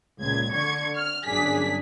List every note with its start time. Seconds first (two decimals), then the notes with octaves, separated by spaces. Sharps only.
0.21 C#2 A#2 G#6
0.53 D3 C#6 G#6
0.97 F6
1.26 G1 F#2 D4 G#4 B6